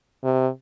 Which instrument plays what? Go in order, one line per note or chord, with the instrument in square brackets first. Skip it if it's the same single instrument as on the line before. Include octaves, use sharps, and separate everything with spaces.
[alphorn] C3